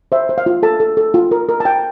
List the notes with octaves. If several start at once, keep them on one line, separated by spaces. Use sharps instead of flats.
C5 E5
C5
F5
F4
A4 A5
A4
A4
F4
A#4
A#4
A5
A#4 G5